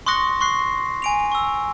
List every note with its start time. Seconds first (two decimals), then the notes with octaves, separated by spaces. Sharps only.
0.06 C6 C#6 D#6 F#6 A#6 C#7
0.41 C6 C#6 F#6 C7
1.02 G#5 D7 F7
1.32 C#6 E6